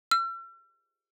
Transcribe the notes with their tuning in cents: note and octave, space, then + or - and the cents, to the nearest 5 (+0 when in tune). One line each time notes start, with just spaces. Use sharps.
E6 +45